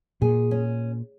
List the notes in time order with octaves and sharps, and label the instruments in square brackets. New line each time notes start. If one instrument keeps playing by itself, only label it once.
[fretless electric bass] A#2 [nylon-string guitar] G#4
[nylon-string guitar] C#4